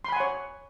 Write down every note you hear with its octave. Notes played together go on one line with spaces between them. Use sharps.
C#5 F#5 G#5 B5 C6